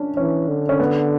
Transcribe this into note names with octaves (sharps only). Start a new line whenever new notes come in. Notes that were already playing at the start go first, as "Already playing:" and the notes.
Already playing: C#4 D4
E3 C#4
D3
C#4
B3